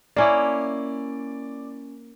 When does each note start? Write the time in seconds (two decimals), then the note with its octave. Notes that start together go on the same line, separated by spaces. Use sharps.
0.16 A#3 C#4 E4 D5